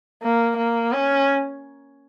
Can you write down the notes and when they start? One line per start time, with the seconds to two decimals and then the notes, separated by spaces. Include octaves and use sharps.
0.23 A#3
0.57 A#3
0.93 C#4